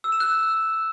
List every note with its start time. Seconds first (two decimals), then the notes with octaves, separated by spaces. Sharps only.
0.04 E6
0.12 E7
0.20 F#6